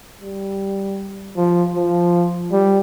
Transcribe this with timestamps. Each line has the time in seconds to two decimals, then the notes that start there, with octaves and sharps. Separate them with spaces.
0.21 G3
1.37 F3
1.76 F3
2.52 G3